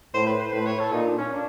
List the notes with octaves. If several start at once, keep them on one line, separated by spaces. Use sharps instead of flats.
A2 C5
B4
C5
A2 B4
C#5
A4
A#2 D#4
D4
C#4
D4